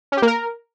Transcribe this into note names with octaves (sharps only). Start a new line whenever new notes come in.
C#4
G4
A#3
A#4